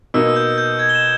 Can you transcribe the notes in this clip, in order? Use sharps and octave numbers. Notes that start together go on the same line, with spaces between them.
B2 A#3 D#4 E6
E6
G6
G6
G#6
G7
E7